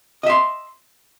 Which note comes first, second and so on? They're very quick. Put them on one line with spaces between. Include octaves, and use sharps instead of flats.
D#5 E5 C6